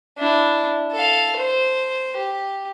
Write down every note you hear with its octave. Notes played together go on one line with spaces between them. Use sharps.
D4 E4
A4 F5
C5
G4